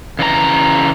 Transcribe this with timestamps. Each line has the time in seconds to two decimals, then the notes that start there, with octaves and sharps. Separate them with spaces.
0.19 C#3 E3 D5 A#5